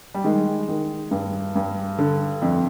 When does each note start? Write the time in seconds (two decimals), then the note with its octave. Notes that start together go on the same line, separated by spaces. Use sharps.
0.14 G3
0.24 D#3 G#3
0.68 D#3
1.11 G2
1.55 G2
1.99 D3
2.42 F2